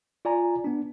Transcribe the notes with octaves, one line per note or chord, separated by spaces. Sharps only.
F4 D5 G#5 A#5
B3 D4